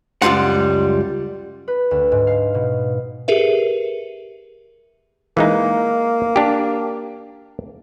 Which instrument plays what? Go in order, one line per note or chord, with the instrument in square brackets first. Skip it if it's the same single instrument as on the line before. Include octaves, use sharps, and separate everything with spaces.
[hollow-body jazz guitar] C#2 F#2 G3 F4 F#5
[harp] B4
D2
G#2
F5
B2
[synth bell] G4 G#4 A#4 B4 E5
[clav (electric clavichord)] E3 G#3 D#4 [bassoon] A#3
[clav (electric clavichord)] D4 G4